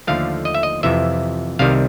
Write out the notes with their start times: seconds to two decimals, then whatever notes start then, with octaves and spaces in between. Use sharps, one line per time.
0.07 D#2 D3 F3 A3 F5
0.45 D#5
0.55 E5
0.63 D#5
0.83 F2 C3 E3 E5
1.59 C2 C3 D#3 G3 F5